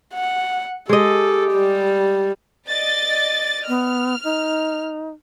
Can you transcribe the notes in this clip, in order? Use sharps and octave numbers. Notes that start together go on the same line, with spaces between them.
F#5
G#3 G4 A4 D#5
G3
D5 D#5 A6
B3 F6
D#4